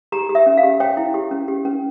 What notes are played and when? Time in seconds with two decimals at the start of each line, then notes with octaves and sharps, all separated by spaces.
0.12 G4 A#5
0.29 G4
0.35 E5
0.46 C#4
0.57 F5
0.63 G4
0.80 C#5 G5
0.97 E4
1.14 G4
1.31 C#4
1.48 G4
1.65 C#4